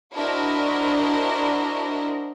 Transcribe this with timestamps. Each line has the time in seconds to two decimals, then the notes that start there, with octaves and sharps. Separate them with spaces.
0.15 D4 E4 F#4 A#4 C5 D#5